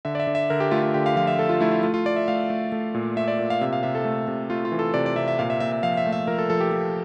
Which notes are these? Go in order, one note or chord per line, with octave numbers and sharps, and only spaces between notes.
D3 E5
D5
E5
D3
E5
D3 A#4
G4
A3 F4
F4
D3 G4
F5
F3 F5
E5
A3 A4
F4
A3 E4
F4
A3 F4
F4
A3 D5
E5
A3 F5
A3
A3
A#2
A3 E5
D5
A#2
F5
C3 E5
F5
C3 E5
A4
A3
C3
A3 F4
F4
E3
A4
C3 D5
D5
C3 E5
E5
A#2 F5
E5
A#2 E5
E5
F3 F5
E5
A3
E5
F3 A#4
A4
F3 A4
G4
F3